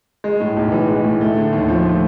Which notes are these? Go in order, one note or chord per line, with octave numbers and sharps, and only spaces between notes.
G#3
A2
B1
E3
G#3
A2
A3
D3
D#2
F3
A3